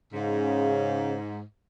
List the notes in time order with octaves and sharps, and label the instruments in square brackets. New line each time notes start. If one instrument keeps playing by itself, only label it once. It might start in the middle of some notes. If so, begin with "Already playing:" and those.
[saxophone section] G#2 [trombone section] C#3